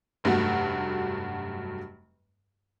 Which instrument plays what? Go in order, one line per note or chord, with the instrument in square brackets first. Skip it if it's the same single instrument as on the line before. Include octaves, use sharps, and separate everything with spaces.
[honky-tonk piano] F1 G2 F#3 A3 F#4